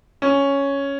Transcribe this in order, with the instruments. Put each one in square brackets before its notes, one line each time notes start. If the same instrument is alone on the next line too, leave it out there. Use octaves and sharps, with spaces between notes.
[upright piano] C#4